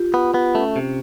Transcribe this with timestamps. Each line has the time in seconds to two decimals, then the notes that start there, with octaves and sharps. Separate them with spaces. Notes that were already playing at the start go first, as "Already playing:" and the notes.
Already playing: F4 G4
0.14 B3
0.34 B3
0.54 A3 C#4
0.76 C3